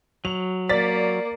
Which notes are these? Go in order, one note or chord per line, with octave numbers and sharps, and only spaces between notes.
F#3 F7
A#3 D5 A6 B6